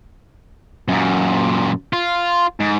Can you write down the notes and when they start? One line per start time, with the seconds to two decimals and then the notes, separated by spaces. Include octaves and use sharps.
0.88 F#2 A#2
1.93 F4
2.60 G#2